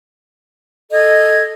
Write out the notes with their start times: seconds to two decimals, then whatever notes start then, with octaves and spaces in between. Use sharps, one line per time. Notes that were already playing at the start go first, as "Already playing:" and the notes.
0.92 A4 D#5 G#6